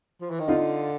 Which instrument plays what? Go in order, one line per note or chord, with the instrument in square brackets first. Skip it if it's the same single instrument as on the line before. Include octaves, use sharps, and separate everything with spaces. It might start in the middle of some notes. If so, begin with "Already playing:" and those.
[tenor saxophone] F3
E3
D#3
[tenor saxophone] D3 [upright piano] D#4 F4